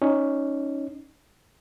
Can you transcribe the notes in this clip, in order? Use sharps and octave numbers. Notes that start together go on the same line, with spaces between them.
C#4 D#4